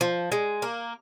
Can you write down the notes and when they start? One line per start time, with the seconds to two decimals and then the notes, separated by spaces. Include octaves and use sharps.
0.01 F3
0.32 G#3
0.62 A#3